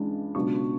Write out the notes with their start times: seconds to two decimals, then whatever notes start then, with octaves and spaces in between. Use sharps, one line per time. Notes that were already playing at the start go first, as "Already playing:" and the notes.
Already playing: C#2 C#3 E3 G#3 D4
0.35 C#2 B2 F#3 B3 D4 C#6